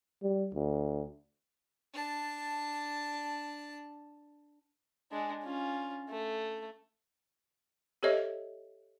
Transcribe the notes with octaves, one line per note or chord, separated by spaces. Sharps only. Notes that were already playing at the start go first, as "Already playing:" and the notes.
G3
D2
D4 A5
G#3 D4
C#4 F4
A3
G4 A4 C5 C#5 D#5 E5